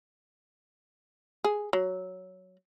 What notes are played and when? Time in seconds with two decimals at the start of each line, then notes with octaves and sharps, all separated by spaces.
1.44 G#4
1.73 F#3